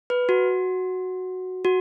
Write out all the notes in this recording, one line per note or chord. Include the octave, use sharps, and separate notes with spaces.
B4
F#4
F#4